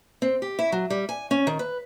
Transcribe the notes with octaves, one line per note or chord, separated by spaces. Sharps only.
C4
G4
E4
F#3
G3
G#5
C#4
D#3
B4